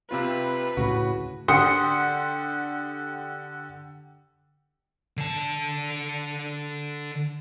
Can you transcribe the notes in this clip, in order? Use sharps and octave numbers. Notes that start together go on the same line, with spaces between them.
C3 C4 F4 B4
D2 A2 C#3 F#4
D3 G4 F#5 C6 D#6 C#7
D3 A5